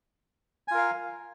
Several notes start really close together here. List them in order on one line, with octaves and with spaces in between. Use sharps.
G#5 F4 A#4 F5